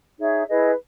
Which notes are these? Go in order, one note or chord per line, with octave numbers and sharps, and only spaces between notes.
D#4 G#4 C#5 E5
E4 G#4 B4 D#5